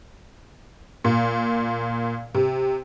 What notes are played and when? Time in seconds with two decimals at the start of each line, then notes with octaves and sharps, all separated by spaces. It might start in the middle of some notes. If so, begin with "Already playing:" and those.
1.04 A#2
2.35 C3